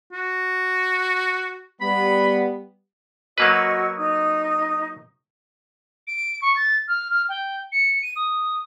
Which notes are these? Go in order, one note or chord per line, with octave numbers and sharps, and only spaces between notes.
F#4
G3 B3 B5
F#3 A#3 F#4 B4 D#5 E6
D#4 D#6
D7
C#6
A6
F6
F6
G5
C#7
D#7
D#6